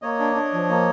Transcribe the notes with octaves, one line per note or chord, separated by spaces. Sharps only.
A#3 C#5 D#5
D4
D4
F3
A#3